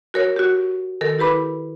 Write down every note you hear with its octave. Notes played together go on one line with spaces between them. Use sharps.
F#4 A#4 C#5
F#4 G4
D#3 A4 A#4
E4 G4 B4 B5 D6